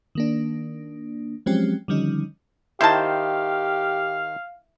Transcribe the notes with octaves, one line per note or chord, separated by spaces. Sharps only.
D#3 A#3 D4
F3 F#3 G#3 C4 C#4 G4
D3 D#3 F3 G3 C#4 D#4
D#3 E4 G4 C5 F5 A5